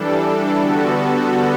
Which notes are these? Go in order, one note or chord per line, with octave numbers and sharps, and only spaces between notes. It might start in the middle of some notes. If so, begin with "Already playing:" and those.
Already playing: E3 G3 D4 A4
D3 G3 B3 F#4 A4